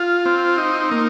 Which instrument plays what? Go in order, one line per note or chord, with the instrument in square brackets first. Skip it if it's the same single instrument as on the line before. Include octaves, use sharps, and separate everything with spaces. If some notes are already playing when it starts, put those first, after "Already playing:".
Already playing: [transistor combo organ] F4
C4
D#4
A#3